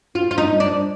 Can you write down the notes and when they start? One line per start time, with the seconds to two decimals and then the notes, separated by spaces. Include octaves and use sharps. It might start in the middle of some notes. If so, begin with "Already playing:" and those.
0.15 F4
0.31 F4
0.38 D#4
0.60 D4